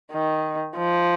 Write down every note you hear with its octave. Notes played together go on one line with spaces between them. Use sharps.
D#3
F3